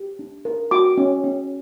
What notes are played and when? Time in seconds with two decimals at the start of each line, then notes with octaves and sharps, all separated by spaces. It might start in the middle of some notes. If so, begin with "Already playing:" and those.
Already playing: G4
0.19 D4
0.45 A#4
0.71 F#4 D6
0.98 C#4
1.24 C#4